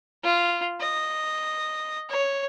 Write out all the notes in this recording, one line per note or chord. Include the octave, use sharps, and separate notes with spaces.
F4
D#5
C#5